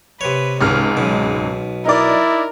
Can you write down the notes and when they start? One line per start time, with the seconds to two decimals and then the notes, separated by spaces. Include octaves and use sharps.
0.21 C3 B4 C#5
0.61 G#1 C#2 G#3 F6
0.97 B1 B2
1.85 D#4 E4 A#4 D5